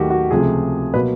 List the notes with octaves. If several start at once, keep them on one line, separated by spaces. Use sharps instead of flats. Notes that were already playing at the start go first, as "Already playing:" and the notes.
Already playing: D#2 D#3 F#3 A3 F#4 G4
F#4
C#2 C3 F3 A3 G#4
B2 F#3 A#3 B4